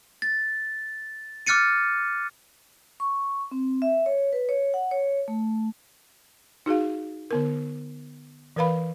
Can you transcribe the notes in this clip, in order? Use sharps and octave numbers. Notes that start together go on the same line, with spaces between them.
A6
D6 F6 F#6 A6 C#7 D#7
C#6
C4
E5
C#5
B4
C#5
F#5
C#5
A3
D#4 F#4 G#4 F5
D3 B3 A#4
E3 A#4 B4 F5 B5